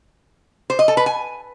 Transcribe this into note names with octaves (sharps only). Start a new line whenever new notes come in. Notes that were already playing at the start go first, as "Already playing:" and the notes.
C5
D#5
A4
B4
G#5